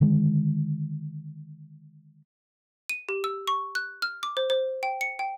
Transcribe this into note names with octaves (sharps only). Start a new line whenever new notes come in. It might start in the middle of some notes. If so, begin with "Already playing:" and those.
D3 D#3 G#3
D#7
G4
E6
C#6
F#6
F6
D6
C5
C5
G5
C#7
G5